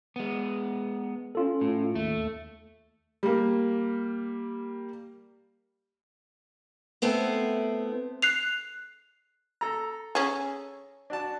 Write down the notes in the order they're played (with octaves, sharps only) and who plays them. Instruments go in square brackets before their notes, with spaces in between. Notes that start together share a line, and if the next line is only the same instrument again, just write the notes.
[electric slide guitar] G#3 B3
[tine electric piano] C#4 F4 A4
[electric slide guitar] A2
[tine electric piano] D#2 [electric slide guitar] A3
[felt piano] G3 A#3
[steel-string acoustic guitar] A3 B3 C4 E4
[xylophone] F#6 C7 F7
[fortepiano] A4 A#5
[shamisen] C#4 G#4
[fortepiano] D4 F#4 A5